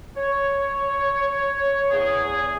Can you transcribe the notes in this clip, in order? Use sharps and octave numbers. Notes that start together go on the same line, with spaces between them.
C#5
E2 G#4